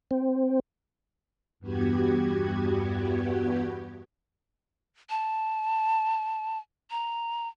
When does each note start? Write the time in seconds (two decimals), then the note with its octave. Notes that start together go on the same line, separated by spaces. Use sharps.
0.11 C4
1.60 E2 G2 B3 F#4 G4 G#6
5.10 A5
6.91 A#5